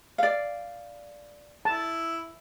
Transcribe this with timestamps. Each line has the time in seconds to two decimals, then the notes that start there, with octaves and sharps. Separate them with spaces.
0.18 D5 F5
1.65 E4 A5